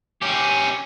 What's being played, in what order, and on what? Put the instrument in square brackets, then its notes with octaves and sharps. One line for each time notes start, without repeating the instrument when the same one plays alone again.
[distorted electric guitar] C#4 G4